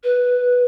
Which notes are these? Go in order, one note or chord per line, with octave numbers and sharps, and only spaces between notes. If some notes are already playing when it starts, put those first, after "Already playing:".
B4